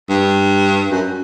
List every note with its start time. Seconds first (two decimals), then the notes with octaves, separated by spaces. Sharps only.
0.10 G2
0.91 F#2